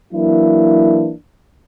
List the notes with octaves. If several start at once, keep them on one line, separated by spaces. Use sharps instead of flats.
E3 F#3 A#3 D4 E4